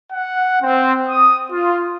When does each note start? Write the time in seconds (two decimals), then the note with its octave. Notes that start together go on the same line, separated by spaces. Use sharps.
0.13 F#5
0.62 C4
1.08 D#6
1.52 F4